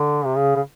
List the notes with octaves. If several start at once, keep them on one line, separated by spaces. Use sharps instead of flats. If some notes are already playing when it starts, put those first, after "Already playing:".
Already playing: D3
C3
C#3
C#3